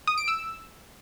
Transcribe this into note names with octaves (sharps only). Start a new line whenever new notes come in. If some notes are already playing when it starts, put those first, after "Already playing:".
D#6
D7
E6